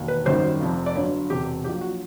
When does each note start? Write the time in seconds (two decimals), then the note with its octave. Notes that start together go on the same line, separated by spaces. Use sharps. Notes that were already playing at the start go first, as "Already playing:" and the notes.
Already playing: E1 D#2
0.08 B4
0.25 G#1 F#2 D#3 G3 C5
0.60 F1 F2 C3 F3
0.86 D5
0.96 G1 G2 D3 F#3 C#5
1.30 E1 E2 C3 G4
1.64 A#1 A#2 F#3 G4
1.81 F#4